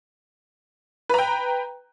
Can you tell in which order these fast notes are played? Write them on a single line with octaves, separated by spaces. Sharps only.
B4 A#5 G5